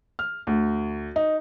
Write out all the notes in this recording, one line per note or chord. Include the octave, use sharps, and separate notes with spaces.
F6
D2
D#4